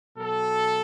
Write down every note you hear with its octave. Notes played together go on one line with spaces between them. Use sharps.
B2 F#3 A4